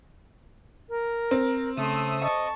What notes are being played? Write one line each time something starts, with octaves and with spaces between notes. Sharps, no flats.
A#4
C4
C#3 A3 E5 C6 D#6
D#5 A5 C#6